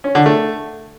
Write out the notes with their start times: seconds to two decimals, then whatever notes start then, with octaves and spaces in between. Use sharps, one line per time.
0.04 C#4
0.15 D3
0.26 A3